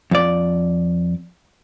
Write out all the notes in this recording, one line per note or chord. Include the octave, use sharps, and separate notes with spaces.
F2 D5